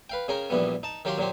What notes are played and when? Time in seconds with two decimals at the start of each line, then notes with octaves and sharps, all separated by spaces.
0.10 B4 F5 G5
0.28 C#3 C#4 G#4 A#4 G5
0.50 A#1 A#2 E3 G3 B3
0.83 D#4 A5
1.05 D#3 F#3 G4 F5 G5 C6
1.18 A#2 F#3 G4 C5